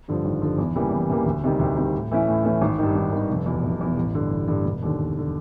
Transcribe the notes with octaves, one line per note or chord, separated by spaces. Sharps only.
G2 D3 F3
G#1
G2 D3 F3
E2
C#3 E3 G3 A#3
E2
C#3 E3 G3 A#3
D2
C3 D#3 G3
D2
C3 D#3 G3
A2
E3 A3 C#4 E4
A2
E3 A3 C#4 E4
G#1
G2 D#3
G#1
G2 D#3
F1
E2 B2
F1
E2 B2
A1
G2 D3
A1
G2 D3
E1
D#2 D3
E1
D3